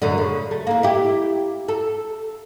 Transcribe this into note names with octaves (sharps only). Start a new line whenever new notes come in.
F#2 A2 D3
C#3
A3
E3 A#3
E4 G4
A4